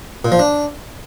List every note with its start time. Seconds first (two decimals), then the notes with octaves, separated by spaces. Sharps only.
0.25 A#2
0.32 F3
0.39 D4